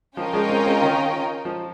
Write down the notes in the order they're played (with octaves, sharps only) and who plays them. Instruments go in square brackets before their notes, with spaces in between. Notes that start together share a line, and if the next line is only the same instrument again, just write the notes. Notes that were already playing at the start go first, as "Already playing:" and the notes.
[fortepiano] F3 [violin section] C#4 F4 A#4 D#5 G5
[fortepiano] F3 G#3
G#3 C4
G#3 C4
D#3
F3